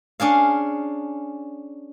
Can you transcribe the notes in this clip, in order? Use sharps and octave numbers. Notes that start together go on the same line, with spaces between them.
C#4 D4 G#4 F5